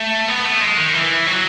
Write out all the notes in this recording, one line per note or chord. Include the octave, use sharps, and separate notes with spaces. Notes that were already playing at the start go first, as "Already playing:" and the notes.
Already playing: A3
B3
A3
G#3
D#3
E3
F#3